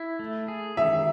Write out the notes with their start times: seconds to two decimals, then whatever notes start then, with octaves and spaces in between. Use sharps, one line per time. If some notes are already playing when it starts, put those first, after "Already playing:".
Already playing: E4
0.19 A3
0.48 G#4
0.77 D#3 E5